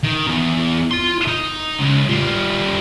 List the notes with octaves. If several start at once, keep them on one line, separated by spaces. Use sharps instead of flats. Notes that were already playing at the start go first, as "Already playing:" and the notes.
D#3
E2
F4 C6
D#4
C#2
G3 F4